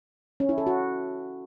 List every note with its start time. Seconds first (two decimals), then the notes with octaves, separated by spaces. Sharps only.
0.40 C#4
0.49 E4
0.58 A4
0.67 F#4